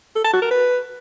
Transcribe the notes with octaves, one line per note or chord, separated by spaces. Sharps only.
A4
A5
F#4
A#4
B4